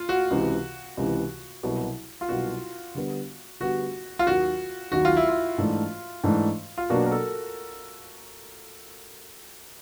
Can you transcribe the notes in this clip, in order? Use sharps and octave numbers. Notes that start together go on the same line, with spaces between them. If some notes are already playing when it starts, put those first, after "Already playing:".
Already playing: F4
F#4
C#2 C3 E3
C#2 C3 E3
C2 B2 F#3
F4
C2 B2 F#3 F#4
D3 G3 B3
D3 G3 B3 F#4
F4
D#2 D#3 F#3 F#4
D#2 D#3 F#3 F#4
F4
E4
F4
G#2 E3 A3 D4
G#2 E3 A3 D4
F4
B2 F#3 A#3 D4 F#4
A#4
A4